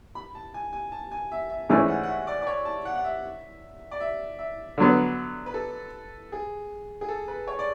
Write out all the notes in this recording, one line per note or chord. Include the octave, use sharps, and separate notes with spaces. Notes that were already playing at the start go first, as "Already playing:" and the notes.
B5
A5
G#5
G#5
A5
G#5
E5
E5
G#2 E3 A3 C#4 D5
F#5
F#5
E5
D5
D5
C#5
A5
F#5
F#5
E5
D5
E5
E5
D3 F#3 B3
B4
A4
G#4
G#4
A4
B4
C#5
D5